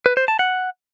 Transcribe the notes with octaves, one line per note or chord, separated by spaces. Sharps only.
B4
C5
A5
F#5